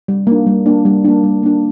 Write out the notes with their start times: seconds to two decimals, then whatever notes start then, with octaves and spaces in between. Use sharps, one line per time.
0.08 G3
0.27 A#3 D4
0.47 G3
0.66 A#3 D4
0.85 G3
1.05 A#3 D4
1.24 G3
1.43 A#3 D4